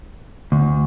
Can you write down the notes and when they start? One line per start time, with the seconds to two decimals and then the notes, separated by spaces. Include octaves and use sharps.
0.52 D2